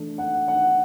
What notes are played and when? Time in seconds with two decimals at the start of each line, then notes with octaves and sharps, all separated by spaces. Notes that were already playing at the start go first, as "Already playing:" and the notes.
Already playing: E3 A3 D4
0.18 F#5
0.48 F#5